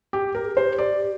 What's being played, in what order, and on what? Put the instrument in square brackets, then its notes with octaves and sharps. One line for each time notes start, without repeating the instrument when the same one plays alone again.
[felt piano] G4
[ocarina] G4 [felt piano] A#4
[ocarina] G#4
[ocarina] G4 [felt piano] C5
[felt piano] D5